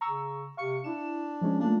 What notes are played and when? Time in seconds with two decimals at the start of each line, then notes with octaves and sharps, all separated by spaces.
0.01 C#3 A#5 C#6 E6
0.57 C3 F5 C#6 C#7
0.84 D4 E4 E7
1.41 F3 G#3 C#4
1.60 A3 A#3 D4 F4